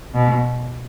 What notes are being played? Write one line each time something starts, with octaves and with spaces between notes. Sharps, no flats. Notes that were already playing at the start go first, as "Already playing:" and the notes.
B2